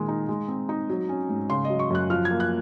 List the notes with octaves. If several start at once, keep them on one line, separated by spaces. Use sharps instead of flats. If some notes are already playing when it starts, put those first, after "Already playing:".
Already playing: A#2 D#3 G#3
D#4
G#3
C4
D#4
F#3
C#4
G#2
C#3 C6
D#5
F#3
C#6
F#2 F#6
F3 F6
G#6
A#3
F#6